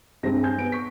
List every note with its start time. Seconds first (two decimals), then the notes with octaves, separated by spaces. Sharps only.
0.23 G2 C3 G#3 G4 C5 A#6
0.43 G#5 G6
0.58 B3 D7
0.72 C#6 B6